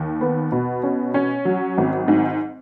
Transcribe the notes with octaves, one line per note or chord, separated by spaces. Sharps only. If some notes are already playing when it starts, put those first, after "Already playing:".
Already playing: D#2
B3
B2
C#4
C#4
F#3
G#1
G#2